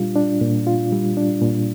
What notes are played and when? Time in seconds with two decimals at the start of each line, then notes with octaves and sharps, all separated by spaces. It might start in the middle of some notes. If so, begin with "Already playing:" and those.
Already playing: A#2 G3 D4 F4
0.16 D4
0.41 A#2
0.67 F4
0.92 G3
1.17 D4
1.42 A#2